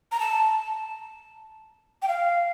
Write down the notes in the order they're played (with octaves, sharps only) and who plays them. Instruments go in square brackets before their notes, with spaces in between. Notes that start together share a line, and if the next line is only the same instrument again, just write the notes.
[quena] A#5
A5
G5
F5